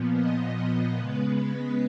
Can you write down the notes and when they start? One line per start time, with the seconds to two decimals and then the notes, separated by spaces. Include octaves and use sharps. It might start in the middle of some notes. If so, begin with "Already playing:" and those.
Already playing: A#2 F3 B3
0.14 D#5
0.42 D#5
0.98 C#3 G#3 B3 B4
1.55 B4